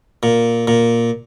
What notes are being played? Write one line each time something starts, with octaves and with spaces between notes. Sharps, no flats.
A#2
A#2